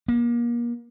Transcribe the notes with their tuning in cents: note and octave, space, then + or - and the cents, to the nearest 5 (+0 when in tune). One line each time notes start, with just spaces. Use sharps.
A#3 +35